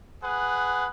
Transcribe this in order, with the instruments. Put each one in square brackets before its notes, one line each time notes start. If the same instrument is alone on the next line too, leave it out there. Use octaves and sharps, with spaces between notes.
[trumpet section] G#4 B4 F#5